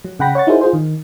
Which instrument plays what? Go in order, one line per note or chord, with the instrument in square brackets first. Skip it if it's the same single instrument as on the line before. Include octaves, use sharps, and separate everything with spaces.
[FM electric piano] F#3
C#3 F#5 G5 B5 A#6
C#5 F#5 C#6 A6
D#4 E4 F#4 G#4 A#4 C5
F4 G#4 C5
D#3